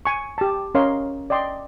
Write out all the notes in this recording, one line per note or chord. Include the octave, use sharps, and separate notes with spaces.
G#5 C#6
G4 A5
C#4 A#4 C#5 D#5 F5 C6
D5 D#5 G5 C6